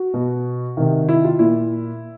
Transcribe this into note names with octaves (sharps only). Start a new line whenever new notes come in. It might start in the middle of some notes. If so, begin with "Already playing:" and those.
Already playing: F#4
B2
C3 D#3
E4
F4
A#2 E4